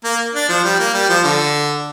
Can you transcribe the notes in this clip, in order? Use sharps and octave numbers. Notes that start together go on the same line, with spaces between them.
A#3
D4
F3
G3
A#3
G3
F3
D3